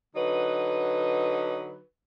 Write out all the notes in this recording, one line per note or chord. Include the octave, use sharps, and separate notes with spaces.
D3 F#3 D#4 B4